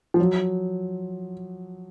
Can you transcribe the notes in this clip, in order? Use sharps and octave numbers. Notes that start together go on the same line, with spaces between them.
F3
F#3